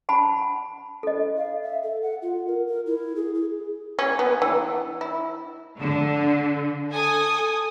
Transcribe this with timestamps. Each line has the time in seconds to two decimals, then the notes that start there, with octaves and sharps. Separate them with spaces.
0.09 F#5 A5 B5
1.03 A4 D#5
1.37 F5
1.62 E5
1.83 A4
2.02 F#5
2.22 F4
2.47 A#4
2.67 A#4
2.86 E4
3.16 G#4
3.34 G#4
3.99 C#4
4.19 B3
4.42 E3
5.01 E4
5.79 D3
6.92 A4 G#5 D#6